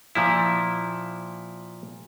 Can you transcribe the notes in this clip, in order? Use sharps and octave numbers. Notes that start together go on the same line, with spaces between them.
A#2 F3 E4